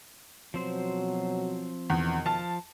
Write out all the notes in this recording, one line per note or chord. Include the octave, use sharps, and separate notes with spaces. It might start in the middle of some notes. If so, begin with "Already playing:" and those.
B2 F3 F#3 C4 C5
E2 B2 D#3
F3 F5 A5